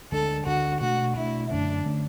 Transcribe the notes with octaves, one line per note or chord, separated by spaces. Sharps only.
D2 D3 G#3 D4 A4
D2 D3 G#3 D4 F#4
B2 A3 D4 F#4
B2 A3 D4 E4
F#2 D3 A3 C#4 D4
D3 A3 C#4